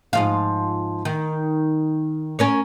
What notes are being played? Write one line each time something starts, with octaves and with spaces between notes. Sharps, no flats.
G#2 F3 F5
D#3
C#4 A#4 C#5